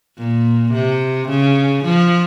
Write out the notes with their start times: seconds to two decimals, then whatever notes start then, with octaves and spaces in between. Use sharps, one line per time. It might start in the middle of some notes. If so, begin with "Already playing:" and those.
0.17 A#2
0.73 C3
1.29 C#3
1.85 F3